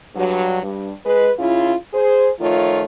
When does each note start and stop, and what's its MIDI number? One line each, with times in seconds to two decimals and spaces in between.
0.15 0.58 43
0.15 0.58 54
0.63 0.90 43
1.05 1.30 56
1.05 1.30 71
1.39 1.74 49
1.39 1.74 64
1.39 1.74 65
1.94 2.29 68
1.94 2.29 72
2.39 2.84 51
2.39 2.84 53
2.39 2.84 57
2.39 2.84 65
2.39 2.84 73